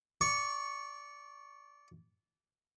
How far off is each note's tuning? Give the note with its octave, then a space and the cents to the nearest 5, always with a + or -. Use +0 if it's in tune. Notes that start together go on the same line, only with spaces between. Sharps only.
D5 -20 C#6 +0